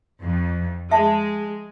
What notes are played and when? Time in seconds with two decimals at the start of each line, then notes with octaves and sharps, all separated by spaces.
0.21 F2
0.91 G#3 E5 A5